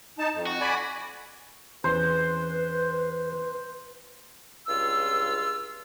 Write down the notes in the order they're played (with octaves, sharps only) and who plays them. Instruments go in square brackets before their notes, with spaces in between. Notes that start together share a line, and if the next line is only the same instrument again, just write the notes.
[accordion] D#4 A5
F2
[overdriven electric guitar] F#4
[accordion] D5 G#5 B5
[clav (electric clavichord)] E2 E3 C#4 [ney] B4 [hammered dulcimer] C5
[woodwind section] C#2 G2 F4 E6